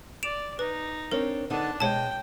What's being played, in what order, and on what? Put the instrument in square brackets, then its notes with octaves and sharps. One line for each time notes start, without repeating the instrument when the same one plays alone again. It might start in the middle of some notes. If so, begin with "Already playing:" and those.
[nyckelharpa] D5 [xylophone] D7 E7 F7
[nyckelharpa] D#4 [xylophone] B4
[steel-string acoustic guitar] C4 D4 C#5 [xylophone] A#4
[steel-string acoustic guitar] D3 B3 D#4 [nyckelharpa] D4 A5
[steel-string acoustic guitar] B2 G#3 D#5 [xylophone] C#5 A5 [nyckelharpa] G5